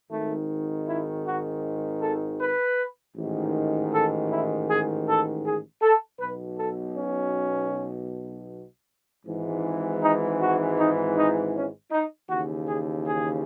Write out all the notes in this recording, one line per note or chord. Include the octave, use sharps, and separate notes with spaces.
G#1 G#2 D#3 A3
E4
F#4
A4
B4
A1 G#2 D#3
A4
E4
G#4
A4
G#4
A4
B1 B2 B4
A4
C#4
G#1 G#2 E3
D#4
F#4
D#4
D#4
C#4
D#4
D#2 C#3 E3 F#4
G#4
G#4